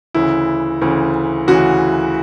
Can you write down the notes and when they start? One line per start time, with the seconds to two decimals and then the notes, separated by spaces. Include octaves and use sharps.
0.14 D2 C#3 E3 E4
0.81 D2 C#3 E3
1.47 D2 C#3 E3 F#4